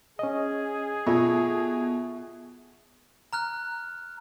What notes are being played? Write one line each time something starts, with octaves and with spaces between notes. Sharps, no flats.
C#4 G#4 D#5
B2 F4 A4 D5 E5 C#6
A#5 F6 F#6